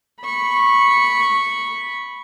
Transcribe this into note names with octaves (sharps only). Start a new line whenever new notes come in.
B5 C#6